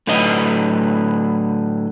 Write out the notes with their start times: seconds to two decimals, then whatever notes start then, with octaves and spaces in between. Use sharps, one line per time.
0.07 A2 D3 F#3 B4 D#5